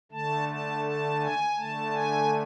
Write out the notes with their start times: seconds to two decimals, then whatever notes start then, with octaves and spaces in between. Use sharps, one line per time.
0.12 D3 A3 A5
0.48 A5
0.84 A5
1.21 G#5
1.56 D3 A3 A5
1.93 G#5